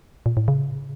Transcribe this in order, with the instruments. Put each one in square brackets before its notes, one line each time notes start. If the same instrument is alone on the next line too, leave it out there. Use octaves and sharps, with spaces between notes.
[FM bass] A#2
A2
C#3